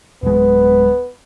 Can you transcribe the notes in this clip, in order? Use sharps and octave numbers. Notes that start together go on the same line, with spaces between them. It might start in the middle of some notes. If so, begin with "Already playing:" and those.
D1 G#3 B3